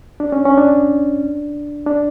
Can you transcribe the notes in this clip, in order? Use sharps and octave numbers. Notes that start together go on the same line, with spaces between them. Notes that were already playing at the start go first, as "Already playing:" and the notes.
D4
C#4
C#4
D4
D4